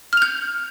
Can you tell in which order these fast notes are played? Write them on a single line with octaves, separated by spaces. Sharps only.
F6 F7 G6